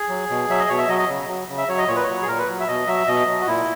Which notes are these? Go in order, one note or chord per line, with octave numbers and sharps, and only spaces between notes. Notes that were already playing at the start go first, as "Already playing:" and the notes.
Already playing: G#4
F#3
B2
F#3 E5
D#5
B2 C#5
E5
F#3 D#5
D#5
C#3
F#3
C#3
E5
F#3 C#5
D#5
A#2 C#5
B4
C#5
F#3
G#4
A#2 A#4
B4
F#3
E5
B2 D#5
F#3 E5
B2 D#5
F#3
F#4
A#2 E4